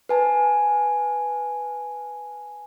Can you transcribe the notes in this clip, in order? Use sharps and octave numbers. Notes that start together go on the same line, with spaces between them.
B4 G#5 A5